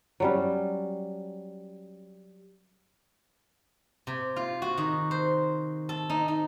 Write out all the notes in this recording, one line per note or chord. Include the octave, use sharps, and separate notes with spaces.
F#3 G3 C#4
C3
F4
F#4
D#3
C5
A4
D#4
D#4